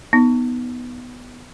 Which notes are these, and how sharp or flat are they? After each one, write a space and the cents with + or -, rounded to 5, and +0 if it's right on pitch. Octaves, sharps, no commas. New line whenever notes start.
B3 +0 D#4 +0